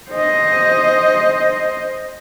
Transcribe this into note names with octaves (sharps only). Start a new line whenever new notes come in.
C5 D#5